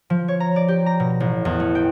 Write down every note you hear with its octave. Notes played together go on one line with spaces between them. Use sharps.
F3
C#5
A#5
D5
G4
A#5
B2
A1
E2
A3
G5